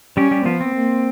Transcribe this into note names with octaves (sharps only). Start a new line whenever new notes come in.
G3 C#4 G4
G3 G4
F3 B3 F4
C4
A#3